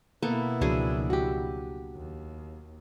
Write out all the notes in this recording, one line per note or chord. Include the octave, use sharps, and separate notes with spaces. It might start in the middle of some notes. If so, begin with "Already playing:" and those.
B2 A#3 B3 E4 A4
C#2 F3 F#3 D4 F#4 G#4
F#4 G4
D#2